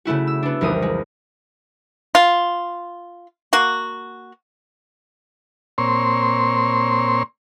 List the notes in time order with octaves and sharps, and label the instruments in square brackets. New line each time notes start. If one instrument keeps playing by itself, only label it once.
[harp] C#3 A3 E4 F#4
E6
B3 D4
F1 C2 E3 A#4 D#6
G#3
[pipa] F4
A#3 F#4
[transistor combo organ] A#2 C4 C#5 C6